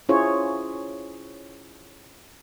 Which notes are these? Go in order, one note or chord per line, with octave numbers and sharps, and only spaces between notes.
C#4 E4 F4 G#4 C5 C#5